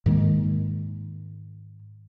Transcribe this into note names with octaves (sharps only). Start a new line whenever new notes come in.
G#2 D#3 G#3 A#3